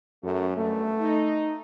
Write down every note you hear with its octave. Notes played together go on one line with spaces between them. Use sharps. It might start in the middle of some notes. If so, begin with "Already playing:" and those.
F#2 A3
G2 B2 A3
D#4